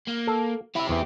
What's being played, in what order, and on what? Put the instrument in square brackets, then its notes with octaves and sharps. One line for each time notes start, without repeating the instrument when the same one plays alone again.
[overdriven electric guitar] A#3
[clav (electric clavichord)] A4
[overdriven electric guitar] C4 G4 [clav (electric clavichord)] E4 E5
[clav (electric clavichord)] E2 E3